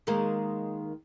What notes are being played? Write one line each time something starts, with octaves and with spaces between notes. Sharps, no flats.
D#3 G#3 A#3